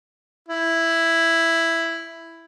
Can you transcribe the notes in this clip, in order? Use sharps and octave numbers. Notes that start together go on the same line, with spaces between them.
E4